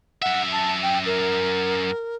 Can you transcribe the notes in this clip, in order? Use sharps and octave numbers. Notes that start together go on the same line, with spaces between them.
F#2 E5 F#5
A5
G5
A#4